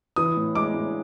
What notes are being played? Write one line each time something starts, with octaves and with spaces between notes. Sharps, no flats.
E3 D#6
A2
G#3 D6
A2